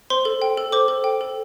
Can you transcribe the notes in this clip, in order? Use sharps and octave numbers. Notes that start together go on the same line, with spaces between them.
C5 C6
A4
G5
A4
C5 D6
A4
G5
A4